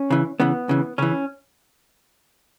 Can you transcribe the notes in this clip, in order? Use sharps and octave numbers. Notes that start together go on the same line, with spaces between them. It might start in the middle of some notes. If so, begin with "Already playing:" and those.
Already playing: C#4
C#3 E3
C#3 E3 B3
C#3 E3
C#3 E3 C#4